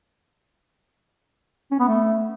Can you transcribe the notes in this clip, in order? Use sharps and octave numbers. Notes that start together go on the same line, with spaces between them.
C#4
B3
A3